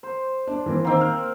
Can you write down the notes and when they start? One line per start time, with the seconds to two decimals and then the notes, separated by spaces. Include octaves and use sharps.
0.03 C5
0.47 D4
0.66 E3 A#3 C4
0.85 D#3 A#3 C4 C5
1.01 F6